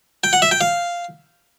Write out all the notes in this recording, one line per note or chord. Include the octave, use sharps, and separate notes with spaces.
G5
F#5
E5
G5
F5